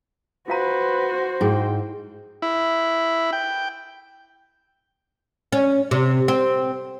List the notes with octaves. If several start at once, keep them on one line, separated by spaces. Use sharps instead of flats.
F4 F#4 B4 C5 F5 A#5
G#2 E4 G#4 G5
E4
G5
C#4
C3
C4